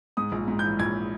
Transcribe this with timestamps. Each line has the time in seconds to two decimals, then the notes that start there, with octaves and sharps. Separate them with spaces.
0.17 G#2 D#6
0.32 A#1
0.48 G#2
0.59 E3 G6
0.79 A#1 G#6